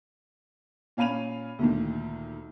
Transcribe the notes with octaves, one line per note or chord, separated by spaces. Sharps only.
A#2 C#4 F5 B5 D#7 F7
D2 A#2 D#3